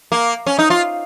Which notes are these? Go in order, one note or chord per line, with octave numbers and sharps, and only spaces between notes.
A#3
C#4
D#4
F4